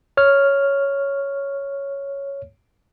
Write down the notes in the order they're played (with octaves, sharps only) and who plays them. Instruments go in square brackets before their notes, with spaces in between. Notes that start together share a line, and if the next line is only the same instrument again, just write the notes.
[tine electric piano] C#5 F6